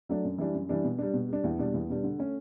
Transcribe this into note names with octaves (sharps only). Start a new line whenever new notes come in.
F#3 A3 D4
F#2
E3 G3 D4
F#2
E3 G3 D4
B2
G3 D4
B2
G3 D4
E2
B2 G3 D4
E2
B2 G3 D4
D3
A3 C#4